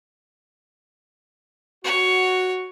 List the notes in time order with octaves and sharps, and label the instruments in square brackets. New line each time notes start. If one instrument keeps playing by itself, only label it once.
[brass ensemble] F#4 [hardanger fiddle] C#5